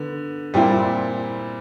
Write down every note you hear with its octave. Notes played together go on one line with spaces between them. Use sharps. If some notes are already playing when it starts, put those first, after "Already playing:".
Already playing: D3 B3
A#2 G3 C4 E4